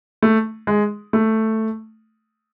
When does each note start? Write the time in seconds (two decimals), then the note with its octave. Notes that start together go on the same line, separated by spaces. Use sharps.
0.22 A3
0.67 G#3
1.13 A3